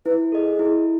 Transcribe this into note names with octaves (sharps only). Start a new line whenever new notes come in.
E4 B4
G#4 A4 D#5
E4